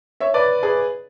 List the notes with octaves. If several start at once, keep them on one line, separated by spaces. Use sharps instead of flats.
C#5 E5
B4 D5
G#4 B4